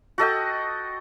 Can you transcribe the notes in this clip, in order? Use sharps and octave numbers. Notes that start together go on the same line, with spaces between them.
F#4 A4 D#5 G5